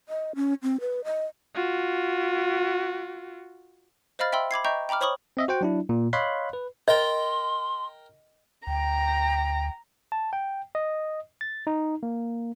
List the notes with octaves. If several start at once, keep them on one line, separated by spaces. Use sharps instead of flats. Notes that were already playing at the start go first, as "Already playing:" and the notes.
D#5
C#4
C4
B4
D#5
F4 F#4
C5 D#5 F5 B5 F6 A6
E5 G5 B5 C6 E6
B5 D6 G#6 C7
D#5 E5 G5 A#5 C#6 G6
G5 A#5 B5 D6 F6
C5 C#5 B5 C#6 D#6 F#7
C4 D#5 E5
F#4 C5 F#5 G5
F#3 D4 E4
A#2
C#5 D#5 F5 B5 C6 F#6
B4
A#4 D#5 G5 C6
D2 G5 A#5
A5
G5
D#5
A6
D#4
A#3